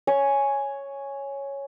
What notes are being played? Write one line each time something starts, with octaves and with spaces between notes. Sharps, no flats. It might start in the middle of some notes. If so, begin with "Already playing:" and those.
C#5 G#5 C#6